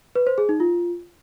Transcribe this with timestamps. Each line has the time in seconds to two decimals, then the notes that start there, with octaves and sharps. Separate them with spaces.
0.15 B4
0.27 C5
0.38 G#4
0.49 D#4
0.60 F4